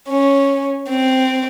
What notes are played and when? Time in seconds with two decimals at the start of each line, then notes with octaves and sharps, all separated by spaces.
0.08 C#4
0.90 C4